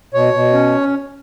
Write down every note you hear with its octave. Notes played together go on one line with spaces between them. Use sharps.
B2 C#5
B2
C#4